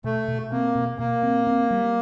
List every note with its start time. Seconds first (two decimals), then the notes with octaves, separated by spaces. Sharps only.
0.04 B2 A3
0.28 B2
0.51 A#3 C4
0.75 B2
0.99 B2 A#3
1.23 C4
1.47 C4
1.71 G3